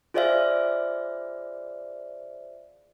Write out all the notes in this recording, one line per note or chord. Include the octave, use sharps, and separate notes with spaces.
F4 G#4 C5 D5 E5 F5